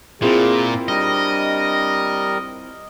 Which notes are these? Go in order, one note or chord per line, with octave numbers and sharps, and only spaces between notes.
A#2 C4 E4 F4 G#4
G3 D4 A#4 D#5